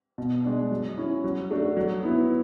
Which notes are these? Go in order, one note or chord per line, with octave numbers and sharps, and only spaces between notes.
B2
G#3 D4
F#3
C#4 E4
F#3
A3 D4 F#4
F#3
B3 E4